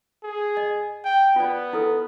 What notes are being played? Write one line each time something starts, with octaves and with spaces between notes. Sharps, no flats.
G#4
D#5
G5
B3 F4 D5
E4 A4 B4